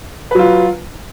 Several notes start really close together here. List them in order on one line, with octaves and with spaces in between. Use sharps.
B4 F#3 F4